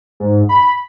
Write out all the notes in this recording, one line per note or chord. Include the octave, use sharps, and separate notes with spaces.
G#2
B5